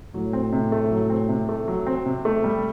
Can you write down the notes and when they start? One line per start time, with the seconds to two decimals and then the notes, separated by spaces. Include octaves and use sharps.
0.14 A2 F#3
0.33 C4
0.52 C3
0.72 A3
0.91 F#3
1.10 C4
1.29 C3
1.49 A3
1.68 F#3
1.87 C4
2.06 C3
2.25 A3
2.44 G3